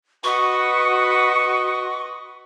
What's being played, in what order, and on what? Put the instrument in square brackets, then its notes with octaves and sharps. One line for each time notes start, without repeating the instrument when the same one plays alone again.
[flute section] F#4 [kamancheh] B4 D#5 [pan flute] C#6